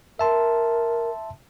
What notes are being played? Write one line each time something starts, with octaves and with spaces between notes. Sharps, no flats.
A#4 E5 A5 C6